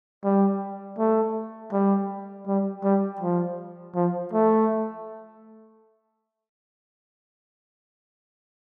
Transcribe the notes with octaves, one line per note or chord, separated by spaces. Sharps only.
G3
A3
G3
G3
G3
F3
F3
A3